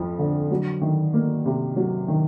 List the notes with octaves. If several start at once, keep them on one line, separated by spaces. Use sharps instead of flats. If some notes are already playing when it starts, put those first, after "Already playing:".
Already playing: F2 F3
D3
F#3
D#3
A#3
C3
F#3
D#3